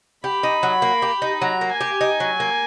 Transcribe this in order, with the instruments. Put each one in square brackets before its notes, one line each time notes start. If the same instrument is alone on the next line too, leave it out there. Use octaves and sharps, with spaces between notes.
[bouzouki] G4 [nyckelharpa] B5
[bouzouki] D#4
F#3
A#3
G4
D#4
[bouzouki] F#3 [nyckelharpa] A#5
[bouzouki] A#3
[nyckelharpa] G#5
[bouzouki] G4
D#4
F#3
A#3